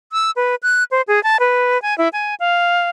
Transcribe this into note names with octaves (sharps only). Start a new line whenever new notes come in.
E6
B4
F#6
C5
G#4
A5
B4
G#5
E4
G#5
F5